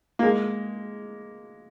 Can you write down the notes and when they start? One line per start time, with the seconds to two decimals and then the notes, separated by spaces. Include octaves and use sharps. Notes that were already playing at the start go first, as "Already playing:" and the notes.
0.19 A#3
0.23 G#3